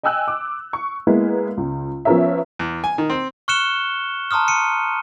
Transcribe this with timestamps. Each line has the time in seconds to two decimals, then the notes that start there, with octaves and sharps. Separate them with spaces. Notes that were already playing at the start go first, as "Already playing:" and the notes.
0.03 D#5 G5 G#5 E6 F#6
0.28 D6
0.73 C#6
1.07 G#3 A#3 B3 E4
1.57 C#2
2.05 F3 B3 C#4 A#4 C#5 E5
2.59 E2
2.84 G#5
2.98 D#3
3.10 C4
3.48 C#6 F6 F#6 C#7 E7 G7
4.31 A5 A#5 C6 D#6 F6
4.48 C#7 D#7